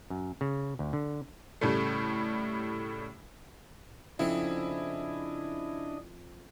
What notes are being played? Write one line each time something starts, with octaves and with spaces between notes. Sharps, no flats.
F#2
C#3
D2
D3
A2 C#3 G3 A3
F2 C#3 C4 D4 E4 D#5